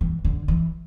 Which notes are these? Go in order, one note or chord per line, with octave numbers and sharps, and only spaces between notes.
E3
D3
E3